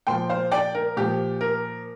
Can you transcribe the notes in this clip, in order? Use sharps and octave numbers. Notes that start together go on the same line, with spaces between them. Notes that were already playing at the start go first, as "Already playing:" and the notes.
A#2 F3 G5 C6
C5 F5
D5 G5
A#4
A#2 F3 G4
A#4